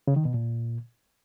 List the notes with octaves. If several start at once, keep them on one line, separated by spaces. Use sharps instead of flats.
C#3
D#3
B2
A#2